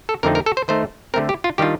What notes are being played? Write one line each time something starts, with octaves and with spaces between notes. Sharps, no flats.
A4
F2 D3 A3 C4 D#4 A#4
A#4
A4
C5
D#3 A3 D#4 C5
D3 A3 C4 A#4
G4
F4
D#3 G3 D4 F4 G4